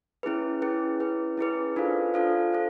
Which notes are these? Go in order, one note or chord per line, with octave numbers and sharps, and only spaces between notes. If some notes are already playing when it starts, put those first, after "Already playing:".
C#4 E4 G#4 B4
C#4 E4 G#4 B4
C#4 E4 G#4 B4
C#4 E4 G#4 B4
D4 F4 A4 C5 F5
D4 F4 A4 C5 F5
A4 C5 F5